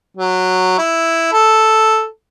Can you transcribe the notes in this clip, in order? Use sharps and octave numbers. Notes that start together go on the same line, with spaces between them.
F#3
E4
A4